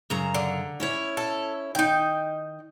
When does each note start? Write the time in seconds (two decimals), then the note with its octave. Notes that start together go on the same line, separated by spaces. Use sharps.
0.10 F#2 C#3 A#5
0.34 D3
0.80 C#4 E4 C#5
1.17 A4
1.75 D#3 D#4 G5